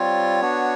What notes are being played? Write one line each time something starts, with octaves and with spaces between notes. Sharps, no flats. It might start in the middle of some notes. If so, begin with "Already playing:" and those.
Already playing: G3 C4 F4 C#5
B3 D4 F#4